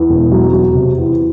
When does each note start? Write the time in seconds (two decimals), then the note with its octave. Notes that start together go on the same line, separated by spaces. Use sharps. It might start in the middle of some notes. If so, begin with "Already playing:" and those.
Already playing: E2
0.09 E1
0.32 F#3
0.53 F#3
0.75 C3
0.98 E2